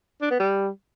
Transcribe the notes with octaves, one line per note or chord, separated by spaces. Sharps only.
D4
B3
G3